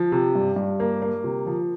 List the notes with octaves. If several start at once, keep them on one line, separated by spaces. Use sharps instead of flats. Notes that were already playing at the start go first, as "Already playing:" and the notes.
Already playing: F3
C3
G2
G2
A#3
A#3
C3
F3